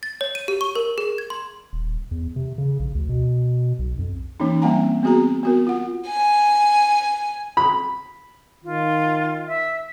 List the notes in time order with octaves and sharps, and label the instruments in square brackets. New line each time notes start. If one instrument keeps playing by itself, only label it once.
[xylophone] A6
C#5
D#7
G4
C#6
A#4
G#4
G#6
C6
[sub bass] D#1
E2
C3
C#3
A#1
D2
B2
B1
F2
[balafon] E3 A#3 C#4 D#4
G3 A#3 C4 F#5 G#5 A#5
B3 C4 F#4 G#4 A#5
B3 F#4 A#4
F4 F#5
[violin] G#5
[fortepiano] B5
[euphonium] D#3 [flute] F4
[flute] E5